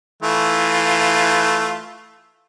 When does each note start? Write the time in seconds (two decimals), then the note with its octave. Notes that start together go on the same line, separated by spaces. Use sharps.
0.22 E3 A3 F4